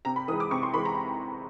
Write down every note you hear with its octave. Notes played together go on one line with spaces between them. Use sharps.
C3 A#5
B5
E3 G#3 D#6
D6
C3 C#6
C6
E3 G#3 B5
A#5